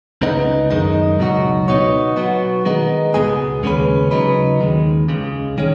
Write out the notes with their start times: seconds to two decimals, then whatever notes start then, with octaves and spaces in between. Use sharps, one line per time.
0.21 C#2 C#3 B3 D#4
0.71 F#2 D#3 G#3 D#4
1.19 C#2 B2 F#3 D#4 F#4
1.68 B2 B3 D#4 F#4 C#5
2.16 B2 F#3 B3 F#4
2.65 D#3 G#3 B3 D#4
3.14 C#2 B2 G#3 B3 G#4
3.63 D#2 C#3 G#3 C#4 B4
4.11 C#3 F#3 D#4 B4
4.60 D#2 D#3 G#3
5.08 C#2 C#3 G#3
5.58 D#3 G#3 C#4